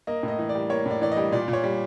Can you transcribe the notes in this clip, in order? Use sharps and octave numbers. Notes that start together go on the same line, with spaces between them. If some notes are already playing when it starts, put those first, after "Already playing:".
A#3 D#5
A2
D#5
E3
D5
G3
A#3 C#5
A2 D5
E3 D5
D#5
G3
A#2 D5
A#2
C#5
G3